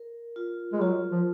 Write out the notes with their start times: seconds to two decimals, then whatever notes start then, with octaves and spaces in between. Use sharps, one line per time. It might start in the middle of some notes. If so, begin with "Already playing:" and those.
Already playing: A#4
0.36 F4
0.73 G#3
0.81 F#3 F4
1.11 F3